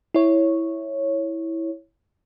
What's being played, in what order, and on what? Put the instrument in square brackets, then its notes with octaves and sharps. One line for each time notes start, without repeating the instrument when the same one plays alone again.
[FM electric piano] E4 C#5